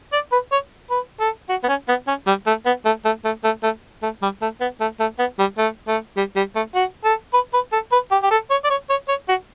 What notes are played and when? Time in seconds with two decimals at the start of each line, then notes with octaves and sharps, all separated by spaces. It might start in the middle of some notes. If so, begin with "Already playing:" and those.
0.13 D5
0.32 B4
0.52 C#5
0.90 B4
1.20 A4
1.49 F#4
1.63 B3
1.68 C#4
1.88 B3
2.08 C#4
2.27 G3
2.47 A3
2.66 B3
2.85 A3
3.05 A3
3.25 A3
3.44 A3
3.63 A3
4.03 A3
4.22 G3
4.42 A3
4.61 B3
4.80 A3
5.00 A3
5.19 B3
5.39 G3
5.58 A3
5.88 A3
6.17 G3
6.36 G3
6.55 A3
6.75 F#4
7.04 A4
7.33 B4
7.53 B4
7.72 A4
7.92 B4
8.11 G4
8.23 G4
8.31 A4
8.50 C#5
8.64 D5
8.70 C#5
8.90 C#5
9.08 C#5
9.28 F#4